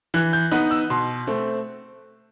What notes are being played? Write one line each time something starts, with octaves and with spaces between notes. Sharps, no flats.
E3 F#6
G6
B3 D#4 F#6
E6
B2 C6
A3 C4